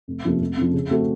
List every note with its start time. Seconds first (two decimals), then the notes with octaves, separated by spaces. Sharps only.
0.08 F1
0.24 F2 C3 F3 A#3
0.40 F1
0.57 F2 C3 F3
0.74 C#3
0.91 A3 C4 F#4